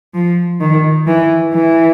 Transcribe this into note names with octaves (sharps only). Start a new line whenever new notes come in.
F3
D#3
E3
E3